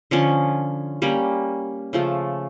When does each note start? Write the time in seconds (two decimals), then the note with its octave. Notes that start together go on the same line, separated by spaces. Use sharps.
0.11 D3 F3 C#4
1.02 G3 A#3 C#4
1.93 C#3 F3 A3